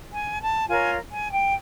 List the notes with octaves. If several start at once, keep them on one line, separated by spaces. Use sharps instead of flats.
G#5
A5
F4 A#4 C#5 G#5
G#5
G5